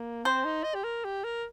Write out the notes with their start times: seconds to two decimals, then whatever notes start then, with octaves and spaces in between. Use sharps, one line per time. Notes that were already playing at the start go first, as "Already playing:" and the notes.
Already playing: A#3
0.25 C4 C5
0.45 D#4
0.64 D#5
0.75 G4
0.84 A#4
1.05 G4
1.24 A#4